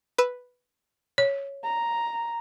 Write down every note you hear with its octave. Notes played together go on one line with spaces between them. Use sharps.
B4 B5 E6
C#5
A#5